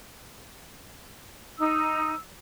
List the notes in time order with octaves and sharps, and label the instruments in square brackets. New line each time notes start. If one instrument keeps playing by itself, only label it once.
[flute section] D#4 [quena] E6